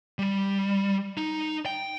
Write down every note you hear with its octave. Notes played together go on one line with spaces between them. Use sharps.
G3
D#4
G5